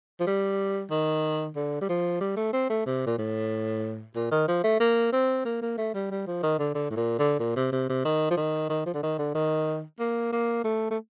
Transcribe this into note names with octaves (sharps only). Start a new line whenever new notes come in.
F3
G3
D#3
D3
G3
F3
G3
A3
C4
A3
C3
A#2
A2
A#2
D#3
F3
A3
A#3
C4
A#3
A#3
A3
G3
G3
F3
D#3
D3
D3
A2
A#2
D3
A#2
C3
C3
C3
D#3
F3
D#3
D#3
F3
D3
D#3
D3
D#3
A#3
A#3
A3
A3